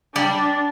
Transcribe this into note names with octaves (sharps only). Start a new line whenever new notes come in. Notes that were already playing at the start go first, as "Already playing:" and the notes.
G3 D4